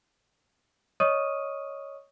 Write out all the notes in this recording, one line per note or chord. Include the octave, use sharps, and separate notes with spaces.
C#5 D#5 C#6 D#6 F6 D#7